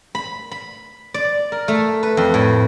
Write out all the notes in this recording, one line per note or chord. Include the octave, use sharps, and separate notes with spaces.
B5
B5
D5
A#4
A3
B4
F2
A2